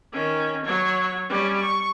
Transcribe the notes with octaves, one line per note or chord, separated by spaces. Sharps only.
D#3 C#4
F#3 C#5
G3 C#4
C#6